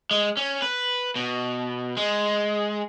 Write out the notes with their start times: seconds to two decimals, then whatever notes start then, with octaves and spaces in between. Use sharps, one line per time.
0.11 G#3
0.37 C#4
0.62 B4
1.16 B2
1.97 G#3